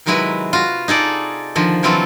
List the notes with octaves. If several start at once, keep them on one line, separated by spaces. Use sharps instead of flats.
C3 D#3 F#3 G#3 E4 B4
F4 F#4
D#4 G#4 A4 D5
D3 D#3 F3
D3 E3 F#3 C4 F4 A4